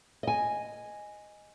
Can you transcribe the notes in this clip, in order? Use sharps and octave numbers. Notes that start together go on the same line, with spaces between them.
D#5 G#5